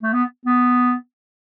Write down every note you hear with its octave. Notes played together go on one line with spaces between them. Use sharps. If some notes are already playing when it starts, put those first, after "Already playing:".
A3
B3
B3